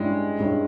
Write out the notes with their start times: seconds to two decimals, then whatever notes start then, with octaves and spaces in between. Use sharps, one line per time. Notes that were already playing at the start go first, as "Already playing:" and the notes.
Already playing: G2 G3 G#3 C#4 E4
0.39 G2 G3 C#4 E4